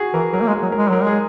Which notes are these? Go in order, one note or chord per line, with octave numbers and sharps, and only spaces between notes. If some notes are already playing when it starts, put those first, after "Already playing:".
Already playing: F#4 G#4
E3 A#4
F#3 A#4
A#3
G#3
G#4
F#3
G#3 A#4
F#3 A#4
G#3 G#4